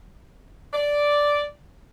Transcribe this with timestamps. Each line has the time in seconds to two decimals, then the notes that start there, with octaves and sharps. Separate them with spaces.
0.74 D5